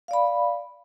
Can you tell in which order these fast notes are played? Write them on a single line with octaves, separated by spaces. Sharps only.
F5 D5 B5